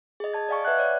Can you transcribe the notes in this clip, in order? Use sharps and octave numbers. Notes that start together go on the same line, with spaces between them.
G#4 D#5
D#5 A5 G#6
D5 D#5 F5 G#5 C#6
B4 E5 F#5 F#6 G#6
C#5 D5